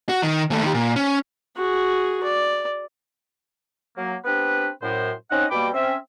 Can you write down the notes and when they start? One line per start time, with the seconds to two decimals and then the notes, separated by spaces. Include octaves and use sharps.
0.09 F#4
0.23 D#3
0.50 D#2 A3
0.63 D#3 G4
0.74 A#2
0.96 C#4
1.56 F#4 G#4
2.23 D5
3.97 F#3 A#3
4.24 B3 C4 D4 G4 B4
4.82 F#2 A2 C5
5.30 C4 C#4 D#4 D#5 F#5
5.51 B2 G3 A#3 G5 B5 D6
5.74 C4 C#4 E5